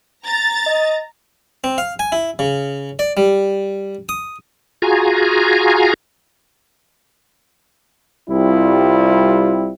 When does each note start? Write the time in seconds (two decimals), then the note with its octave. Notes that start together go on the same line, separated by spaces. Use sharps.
0.24 A#5 A6
0.66 D#5
1.64 C4
1.78 F5
1.99 G#5
2.12 E4
2.39 C#3
2.99 D5
3.17 G3
4.09 D#6
4.82 F4 F#4 G#4 G#5 A#5
8.30 C2 G3 C4 E4 F4